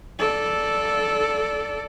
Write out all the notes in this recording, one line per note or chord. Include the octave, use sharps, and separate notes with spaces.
A4 D5